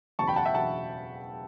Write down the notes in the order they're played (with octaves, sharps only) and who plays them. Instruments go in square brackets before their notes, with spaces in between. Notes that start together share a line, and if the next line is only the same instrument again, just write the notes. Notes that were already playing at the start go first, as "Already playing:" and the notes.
[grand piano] F#1 E2 B2 A5 C#6
G5 B5
F#5 A5
E5 G5
F#1 E2 B2 F#5 A5